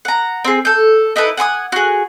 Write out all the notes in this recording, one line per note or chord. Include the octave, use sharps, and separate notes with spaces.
F#5 A#5
C4 G#4
A4 G6
D#4 E4 A4 B4
F#5 G#5 C6 D#6
F#4 G#4